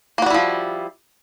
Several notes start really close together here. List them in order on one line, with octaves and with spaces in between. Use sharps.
A#3 F#4 G3 E4 F3